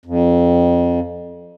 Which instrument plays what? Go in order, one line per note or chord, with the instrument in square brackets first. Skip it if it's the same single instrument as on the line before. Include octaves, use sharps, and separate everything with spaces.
[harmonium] F2